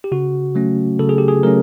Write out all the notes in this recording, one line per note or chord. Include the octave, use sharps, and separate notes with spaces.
G4
C#3 F#4
F#3 A3 C#4
C#3 A4
G#4
G4
G#4
F#3 A3 C#4 A#4